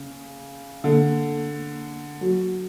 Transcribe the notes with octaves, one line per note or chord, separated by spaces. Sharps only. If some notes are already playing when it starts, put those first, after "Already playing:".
Already playing: C#3
D3
F#3